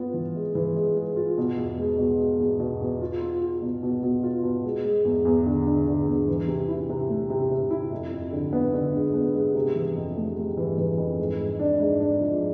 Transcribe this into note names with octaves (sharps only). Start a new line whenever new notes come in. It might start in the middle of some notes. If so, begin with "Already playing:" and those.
Already playing: B3 F4
E3
G#3
E3
G#3
G#3
F4
B2
E2
G#3
B2
G#3
E2
B2
E2
F4
F4
F4
B2
B2
B2
F4
B2
G#3
G#3
E2
E2
D3
D3
D3
E2
E3
C3
E4
C3
A3
C3
C3
E4
F2
F2
D3
B3
D3
G#3
B3
G#3
C3
E3
F2
A3
A3
E3
E3
F2
G#2
G#2
D4
G#2
D4
F3